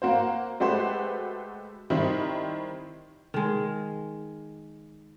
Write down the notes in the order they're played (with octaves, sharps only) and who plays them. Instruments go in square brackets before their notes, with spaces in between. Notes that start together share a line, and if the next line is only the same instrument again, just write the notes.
[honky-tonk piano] A#3 F#4 C5
G#3 A3 F#4 G4 B4 C5
D#3 G3 C4 E4
[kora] D#3 G#3